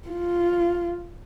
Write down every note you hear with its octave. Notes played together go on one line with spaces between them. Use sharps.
F4